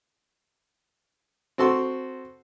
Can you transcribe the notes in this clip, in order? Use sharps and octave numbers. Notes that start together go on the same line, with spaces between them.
C4 F#4 A4 C6